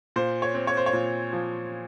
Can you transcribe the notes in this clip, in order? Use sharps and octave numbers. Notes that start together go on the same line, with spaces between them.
A#2 C5
C#5
C4
C#5
C5
C#5
A#2
F3